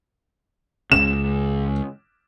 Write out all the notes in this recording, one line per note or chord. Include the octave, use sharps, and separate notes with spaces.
C#2 C#3 E7